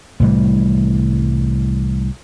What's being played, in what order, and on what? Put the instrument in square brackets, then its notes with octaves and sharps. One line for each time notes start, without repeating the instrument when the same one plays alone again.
[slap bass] C2 A2 E3 G3